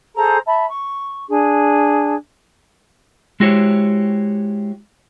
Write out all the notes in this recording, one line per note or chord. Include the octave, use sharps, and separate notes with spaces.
G#4 A4 C5 A#5
E5 A5 B5
C#6
D4 G#4
G#3 E4 F#4 G4 C5 C#5